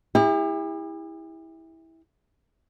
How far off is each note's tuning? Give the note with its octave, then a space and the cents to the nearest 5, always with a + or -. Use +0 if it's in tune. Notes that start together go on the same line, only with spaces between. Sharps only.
E4 -15 G4 +40